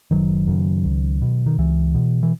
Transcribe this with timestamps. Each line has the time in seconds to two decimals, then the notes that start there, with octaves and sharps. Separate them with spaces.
0.11 F#1 D#3 F#3
0.48 F#2 C#3
0.85 C#2
1.22 B2
1.46 D#3
1.58 C#2 E3
1.95 B2
2.23 E3